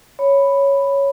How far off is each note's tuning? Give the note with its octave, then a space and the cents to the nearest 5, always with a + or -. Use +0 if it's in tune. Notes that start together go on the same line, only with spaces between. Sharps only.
C#5 +0 B5 +0